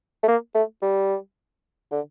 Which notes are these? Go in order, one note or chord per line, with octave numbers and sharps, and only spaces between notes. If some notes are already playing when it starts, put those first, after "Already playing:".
A3
A#3
A3
G3
D3